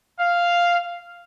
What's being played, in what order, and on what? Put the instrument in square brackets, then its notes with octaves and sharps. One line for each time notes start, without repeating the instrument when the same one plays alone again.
[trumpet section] F5